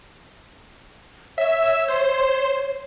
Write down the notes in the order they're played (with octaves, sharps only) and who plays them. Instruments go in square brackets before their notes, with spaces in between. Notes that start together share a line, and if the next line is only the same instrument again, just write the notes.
[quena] C#5 [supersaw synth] E5 E6
[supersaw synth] C5